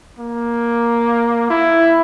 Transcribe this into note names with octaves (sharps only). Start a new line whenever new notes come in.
A#3
E4